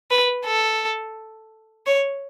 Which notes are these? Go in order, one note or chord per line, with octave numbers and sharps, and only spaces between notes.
B4
A4
C#5